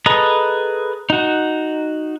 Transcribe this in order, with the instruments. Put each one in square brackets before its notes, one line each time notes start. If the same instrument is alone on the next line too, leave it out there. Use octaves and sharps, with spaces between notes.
[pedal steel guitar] G#4 A4 B4 D#5 A#5
D#4 F#4